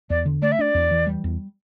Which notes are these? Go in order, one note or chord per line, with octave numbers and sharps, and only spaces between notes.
E2 D5
D3
A3 D5
E5
D4 D5
E2
E3
G3
E2